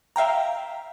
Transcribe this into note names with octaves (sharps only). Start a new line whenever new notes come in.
E5 F5 G5 A#5